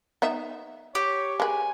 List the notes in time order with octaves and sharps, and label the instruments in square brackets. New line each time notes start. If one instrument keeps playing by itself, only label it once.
[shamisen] B3 D#4 E5
[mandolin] G4 [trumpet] C#5
[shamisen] G#3 B4 [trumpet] G#5